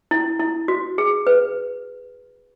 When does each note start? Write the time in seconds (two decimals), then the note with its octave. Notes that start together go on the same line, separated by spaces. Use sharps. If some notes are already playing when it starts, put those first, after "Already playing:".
0.11 E4
0.40 E4
0.68 F#4
0.98 G#4
1.27 B4